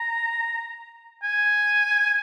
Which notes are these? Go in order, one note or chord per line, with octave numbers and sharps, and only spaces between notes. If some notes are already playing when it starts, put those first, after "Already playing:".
Already playing: A#5
G#5